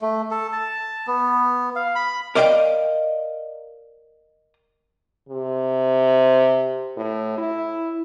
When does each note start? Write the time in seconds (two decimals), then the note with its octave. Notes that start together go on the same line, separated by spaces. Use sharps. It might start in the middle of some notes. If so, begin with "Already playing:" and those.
0.02 A3
0.31 A4
0.52 A5
1.07 B3
1.76 F5
1.95 B5
2.35 A#4 D5 D#5 F5 G5
5.29 C3
6.97 A2
7.38 E4